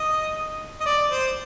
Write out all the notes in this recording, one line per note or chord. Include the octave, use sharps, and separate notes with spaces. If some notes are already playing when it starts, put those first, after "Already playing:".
Already playing: D#5
D#5
D5
C5